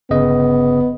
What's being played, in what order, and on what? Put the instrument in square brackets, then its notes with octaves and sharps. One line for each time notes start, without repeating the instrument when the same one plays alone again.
[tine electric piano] G1 C#3 D#5 [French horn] B3